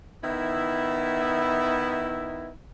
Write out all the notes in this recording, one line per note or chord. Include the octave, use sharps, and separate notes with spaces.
D#3 B3 E4